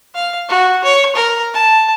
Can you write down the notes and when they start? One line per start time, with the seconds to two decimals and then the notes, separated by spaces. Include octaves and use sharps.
0.15 F5
0.48 F#4
0.84 C#5
1.15 A#4
1.54 A5